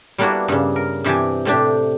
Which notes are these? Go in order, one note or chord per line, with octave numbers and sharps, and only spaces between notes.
G3 A#3 B3 D4 E4 F#4
G2 C#3
A#4
G2 C3 E3 G4 G#5 A5
A2 C3 D4 G4